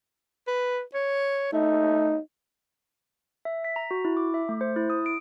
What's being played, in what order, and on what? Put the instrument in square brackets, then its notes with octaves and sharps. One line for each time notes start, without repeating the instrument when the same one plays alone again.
[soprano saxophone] B4
C#5
[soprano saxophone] A3 [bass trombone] D#4
[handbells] E5
B6
A#5
F#4
E4
D6
E5
A3
C5
E4
D#6
D7